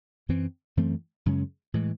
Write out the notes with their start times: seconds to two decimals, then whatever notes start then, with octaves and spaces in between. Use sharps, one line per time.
0.29 F#2 E3 C4
0.77 F#2 E3 A3 C4
1.26 F#2 C#3 G#3 C#4
1.74 A2 E3 G#3